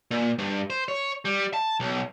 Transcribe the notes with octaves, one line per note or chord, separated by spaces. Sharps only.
A#2
G2
C5
C#5
G3
A5
B1